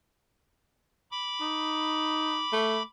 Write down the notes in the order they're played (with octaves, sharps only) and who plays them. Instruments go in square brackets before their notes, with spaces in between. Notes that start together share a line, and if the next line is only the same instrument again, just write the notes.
[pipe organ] B5 D6
[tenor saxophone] D#4
A3